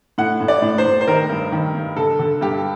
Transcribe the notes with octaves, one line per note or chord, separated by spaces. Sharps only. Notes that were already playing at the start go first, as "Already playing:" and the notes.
A2 F#5
A2
D5
A2
C5
A2
C5
D#3 A#4
G2
D#3
G2
D3 A4
D3
G2 G4